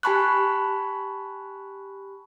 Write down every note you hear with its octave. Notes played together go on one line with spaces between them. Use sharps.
G4 G#5 A5 B5 C#6 F#6